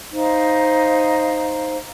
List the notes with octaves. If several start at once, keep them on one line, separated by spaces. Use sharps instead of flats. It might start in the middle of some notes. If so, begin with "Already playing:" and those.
D#4 C5 F5